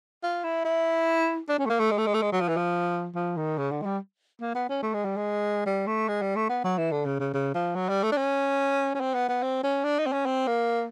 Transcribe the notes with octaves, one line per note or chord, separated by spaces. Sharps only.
F4
E4
E4
D4
C#4
A3
A#3
A3
G#3
A3
G#3
A3
G#3
F#3
F3
E3
F3
F3
D#3
C#3
D3
G#3
G3
A#3
B3
C#4
A3
G#3
G3
G#3
G3
A3
G#3
G3
A3
B3
F#3
E3
D3
C#3
C#3
C#3
F3
F#3
G3
A3
D4
C#4
C#4
C4
B3
B3
C4
C#4
D4
D#4
C4
C#4
C4
A#3